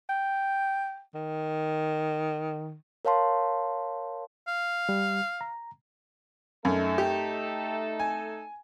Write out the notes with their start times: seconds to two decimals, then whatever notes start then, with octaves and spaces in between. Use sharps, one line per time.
0.09 G5
1.14 D#3
3.05 A#4 C#5 F5 A5 C6
4.48 F5
4.89 G3
5.41 A#5
6.65 F#2 A3 D#4 A4
6.98 G4
8.00 G#5